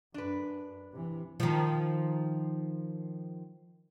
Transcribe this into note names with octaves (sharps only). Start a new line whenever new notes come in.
F#2 D4 B4
C3 E3
D#3 F3